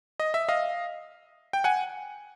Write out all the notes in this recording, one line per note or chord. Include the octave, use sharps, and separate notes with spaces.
D#5
E5
D#5 F5
G5
F#5 G#5